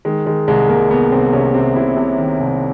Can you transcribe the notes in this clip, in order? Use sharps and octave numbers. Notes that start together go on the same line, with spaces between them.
D#3 G#3
D#3 G#3
C2 G#3
C2 A#3
C2 B3
C2 C4
C3 C#4
C3 C4
C3 E4
C3
D#3
C2